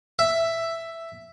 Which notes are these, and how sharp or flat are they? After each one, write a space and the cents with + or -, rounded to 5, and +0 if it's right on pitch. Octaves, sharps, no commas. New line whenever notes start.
E5 +5